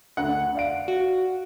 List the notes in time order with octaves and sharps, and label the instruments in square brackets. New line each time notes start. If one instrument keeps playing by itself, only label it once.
[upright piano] D2 F#5
D5 F5 D7
[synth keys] F#4